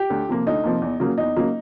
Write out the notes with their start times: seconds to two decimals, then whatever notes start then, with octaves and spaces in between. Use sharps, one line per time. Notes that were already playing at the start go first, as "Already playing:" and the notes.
Already playing: G4
0.10 D2
0.29 C3 F3 A#3
0.46 D2 D#4
0.64 C3 F3 A#3
0.82 E2
1.00 C#3 F#3 A#3
1.18 E2 D#4
1.36 C#3 F#3 A#3